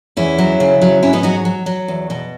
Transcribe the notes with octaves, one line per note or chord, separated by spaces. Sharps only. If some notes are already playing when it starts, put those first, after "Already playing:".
E2 C#4 E4
F#3
C#3
F#3
G#2 C#4 E4
B3 D#4
F#3 D#4 F#4
F#3
F#3
E2
B2